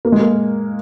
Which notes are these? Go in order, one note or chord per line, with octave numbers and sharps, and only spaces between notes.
A#3
G#3
A#3